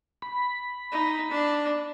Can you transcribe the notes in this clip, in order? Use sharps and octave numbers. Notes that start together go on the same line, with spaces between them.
B5
D#4
D4